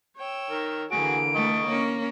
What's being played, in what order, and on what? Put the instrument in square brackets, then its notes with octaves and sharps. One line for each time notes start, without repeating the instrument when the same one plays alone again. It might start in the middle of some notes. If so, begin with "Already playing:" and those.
[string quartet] C#5 G5 E6
[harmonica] D#3 A#4
[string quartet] D3 E3 A#3 [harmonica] F#4 G#4 [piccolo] D7
[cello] A3 [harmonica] D#5 C#6
[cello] A#3 C#4